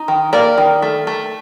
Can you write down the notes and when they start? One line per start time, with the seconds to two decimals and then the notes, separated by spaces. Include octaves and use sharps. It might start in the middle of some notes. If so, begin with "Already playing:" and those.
Already playing: D#4
0.08 D#3
0.33 A#3 A#4 D5
0.58 D#3
0.82 A3
1.07 A3